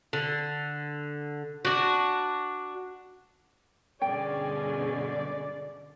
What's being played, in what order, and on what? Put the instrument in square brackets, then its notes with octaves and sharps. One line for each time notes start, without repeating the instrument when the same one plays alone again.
[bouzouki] D3
D4 F#4
[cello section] G2 B2 D3 [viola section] C#4 G#4 G#5 [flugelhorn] D5 [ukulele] G5